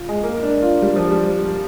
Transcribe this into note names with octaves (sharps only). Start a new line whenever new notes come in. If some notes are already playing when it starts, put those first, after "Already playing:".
Already playing: F4
G#3
A#3
D4
F4
G3
F3
G3